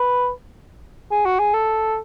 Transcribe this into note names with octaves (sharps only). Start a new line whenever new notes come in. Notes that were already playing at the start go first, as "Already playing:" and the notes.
Already playing: B4
G#4
F#4
G#4
A4